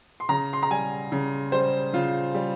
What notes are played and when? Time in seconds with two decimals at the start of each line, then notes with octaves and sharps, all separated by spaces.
0.20 C6
0.29 C#3 A#5
0.53 C6
0.63 A#5
0.71 G3 G#5
1.12 C#3
1.52 G3 C5
1.93 C#3 F4
2.34 G3